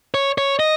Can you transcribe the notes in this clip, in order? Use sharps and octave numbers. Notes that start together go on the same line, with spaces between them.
C#5
C#5
D#5